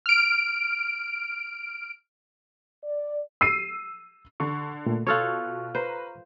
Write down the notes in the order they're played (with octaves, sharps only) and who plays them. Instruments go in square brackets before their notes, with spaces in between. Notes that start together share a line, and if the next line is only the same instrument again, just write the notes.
[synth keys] F6 D7
[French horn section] D5
[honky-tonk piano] E6 C7 D#7
[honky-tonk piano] D3 [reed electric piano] C#6
[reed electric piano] A#2 A3
[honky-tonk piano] B2 [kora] F4 A4 C#5 [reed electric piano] C#6 F6 F#6
[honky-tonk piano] B4 A#5 [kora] C5